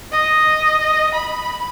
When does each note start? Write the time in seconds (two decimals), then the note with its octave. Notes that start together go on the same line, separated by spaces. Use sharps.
0.12 D#5
1.14 B5